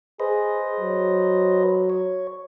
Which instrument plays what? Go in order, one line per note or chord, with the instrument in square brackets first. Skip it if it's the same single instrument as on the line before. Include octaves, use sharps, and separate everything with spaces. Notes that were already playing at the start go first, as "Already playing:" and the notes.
[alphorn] G#4 [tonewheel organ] B4 C5 D#5
[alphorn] F#3
[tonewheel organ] C#5